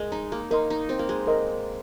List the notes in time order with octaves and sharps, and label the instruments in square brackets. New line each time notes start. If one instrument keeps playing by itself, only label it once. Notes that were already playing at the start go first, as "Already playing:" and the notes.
Already playing: [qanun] G#3 [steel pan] A#4 D#5
[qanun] D#4
A#3
[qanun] D#4 [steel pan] A#4 D#5 C6
[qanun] D#4
C4
A#3
G#3
[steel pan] A#4 D#5 C6